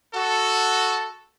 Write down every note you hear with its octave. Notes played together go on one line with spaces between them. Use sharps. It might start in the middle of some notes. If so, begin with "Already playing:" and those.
F#4 A4